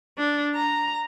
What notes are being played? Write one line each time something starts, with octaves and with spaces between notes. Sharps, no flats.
D4
A#5